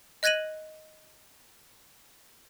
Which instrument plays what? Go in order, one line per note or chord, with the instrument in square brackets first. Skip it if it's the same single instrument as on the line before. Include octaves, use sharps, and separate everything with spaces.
[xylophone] D#5 F#6 G#6 A#6 D#7 F#7